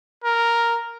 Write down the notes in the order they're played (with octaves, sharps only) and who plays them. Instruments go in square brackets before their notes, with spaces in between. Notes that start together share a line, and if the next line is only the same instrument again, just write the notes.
[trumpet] A#4